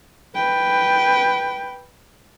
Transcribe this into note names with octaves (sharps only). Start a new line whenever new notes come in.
B4 G5